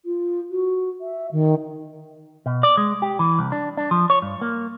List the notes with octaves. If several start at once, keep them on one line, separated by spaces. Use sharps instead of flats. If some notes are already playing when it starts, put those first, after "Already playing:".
F4
F#4
E5
D#3
B2
D5
G#3
G4
E3
C2
D4
D4
F3
C#5
G2
A#3